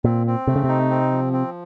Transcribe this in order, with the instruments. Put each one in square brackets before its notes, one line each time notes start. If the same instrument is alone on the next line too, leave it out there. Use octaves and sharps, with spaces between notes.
[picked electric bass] A#2 [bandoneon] C4
[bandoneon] C4
[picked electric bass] C3 [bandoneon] A3
[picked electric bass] C#3
[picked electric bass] C3 [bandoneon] D#4
[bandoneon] C4
F3
C4